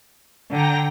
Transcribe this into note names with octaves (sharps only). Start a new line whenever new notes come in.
D3 G5 A#5 A#6